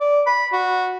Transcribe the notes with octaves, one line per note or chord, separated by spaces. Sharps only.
D5
B5
F#4